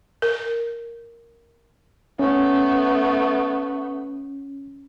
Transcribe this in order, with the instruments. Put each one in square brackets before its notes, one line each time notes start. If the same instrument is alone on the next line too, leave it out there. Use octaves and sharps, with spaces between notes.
[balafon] A#4
[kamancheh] A3 B3 [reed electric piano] C#4